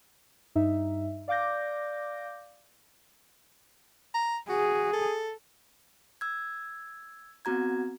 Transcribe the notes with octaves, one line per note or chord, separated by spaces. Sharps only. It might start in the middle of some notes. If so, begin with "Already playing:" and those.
G2 D#4 E5
D5 F5 D6 G6 A#6
A#5
F#4 G#4
A4
E6 G#6
B3 C4 F#4 A#5 G#6